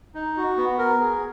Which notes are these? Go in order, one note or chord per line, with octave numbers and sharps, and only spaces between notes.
D#4
F#4
B3
A#4
G#4